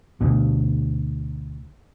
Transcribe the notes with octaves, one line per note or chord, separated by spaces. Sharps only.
D2 B2